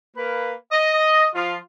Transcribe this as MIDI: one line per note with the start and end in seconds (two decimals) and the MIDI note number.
0.16 0.52 58
0.16 0.52 71
0.71 1.26 75
1.35 1.55 53
1.35 1.55 65